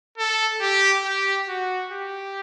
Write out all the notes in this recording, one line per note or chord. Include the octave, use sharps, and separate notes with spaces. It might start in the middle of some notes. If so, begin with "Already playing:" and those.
A4
G4
G4
F#4
G4